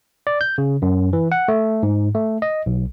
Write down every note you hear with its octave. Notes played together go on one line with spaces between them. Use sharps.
D5
G6
C#3
F#2
E3
F#5
A3
G#2
A3
D#5
B1